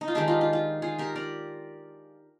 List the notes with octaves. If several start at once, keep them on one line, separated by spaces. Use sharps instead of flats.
D#4
F4
D#3 G#3 D4 D#4 G4
F4
F4
F4
F4 G#4
G4 A#4
A#4 D5